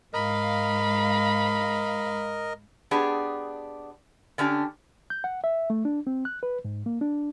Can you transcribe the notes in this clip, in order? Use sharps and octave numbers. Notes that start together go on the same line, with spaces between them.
G#2 A#4 D#5 F5 B5
B3 D4 G4 G#4
D3 C#4 D4 G4
G6
F#5
E5
A3
D4
C4
F#6
B4
G#2
A#3
D4